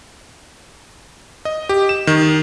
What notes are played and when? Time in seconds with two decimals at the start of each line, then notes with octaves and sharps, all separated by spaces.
1.45 D#5
1.69 G4
1.89 E7
2.07 D#3